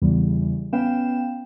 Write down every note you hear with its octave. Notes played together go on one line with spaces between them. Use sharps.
E2 C#3 E3 G3
B3 C#4 B4 F5 G5 E7